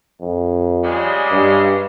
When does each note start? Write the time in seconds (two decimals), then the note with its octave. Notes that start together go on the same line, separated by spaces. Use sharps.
0.21 F2
0.84 C#3 G3 G#3
1.31 G2